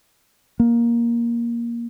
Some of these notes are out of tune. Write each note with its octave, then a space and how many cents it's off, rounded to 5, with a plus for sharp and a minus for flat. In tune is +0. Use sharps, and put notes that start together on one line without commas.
A#3 +10